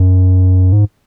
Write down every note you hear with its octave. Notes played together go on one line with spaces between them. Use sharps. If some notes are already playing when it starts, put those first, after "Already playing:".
Already playing: F#2
G#2